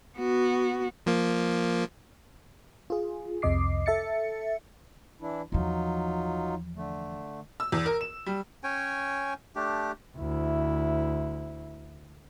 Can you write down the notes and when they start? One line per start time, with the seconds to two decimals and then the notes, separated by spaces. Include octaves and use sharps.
0.18 B3 F#4
1.06 F3 A#3
2.90 F4 G#4
3.42 C2 F2 C3 D#5 D6 C7
3.86 A4 E5 A6 C#7
5.21 E3 D4 E4
5.52 E2 F3 F#3 D#4 F4
6.76 D3 A3
7.60 E6
7.72 E2
7.86 A#4
8.01 E7
8.26 G3
8.64 C#4 C#5 G5 G#5
9.56 A3 D4 G4
10.17 D2 E4